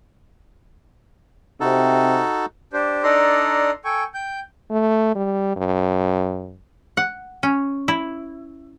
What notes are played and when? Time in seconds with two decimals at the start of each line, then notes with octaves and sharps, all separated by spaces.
1.60 C3 D#4 F#4 A4
2.73 D4 G4 C5
3.04 D4 D#4 A4 D5 A#5 C6
3.85 A4 G5 G#5 C#6
4.14 G5 G6
4.71 A3
5.16 G3
5.56 F#2
6.97 F#5
7.43 C#4
7.88 E4